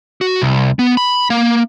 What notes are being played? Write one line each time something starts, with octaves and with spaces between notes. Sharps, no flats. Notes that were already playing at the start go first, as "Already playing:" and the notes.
F#4
C2
B3
B5
A#3